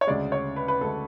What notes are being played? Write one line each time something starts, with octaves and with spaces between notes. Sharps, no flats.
C#5
D2 C#3 G#3 D5
C#5
B4
B4
D2 C#3 G#3 A4